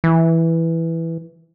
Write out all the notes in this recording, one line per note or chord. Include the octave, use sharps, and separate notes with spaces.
E3